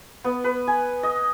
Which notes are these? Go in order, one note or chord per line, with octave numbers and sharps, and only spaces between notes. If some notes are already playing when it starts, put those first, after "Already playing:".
B3
B4
G#5
D#5